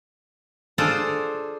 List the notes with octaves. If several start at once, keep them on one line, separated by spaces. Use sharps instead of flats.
D4 F4 G#4 A4 C5 D5